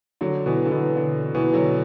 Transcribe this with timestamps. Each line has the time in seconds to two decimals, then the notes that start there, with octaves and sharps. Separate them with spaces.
0.21 D3 F#3
0.46 B2 E3
0.66 D3
0.71 B2 E3
0.97 D3
1.35 B2 E3
1.53 D3 F#3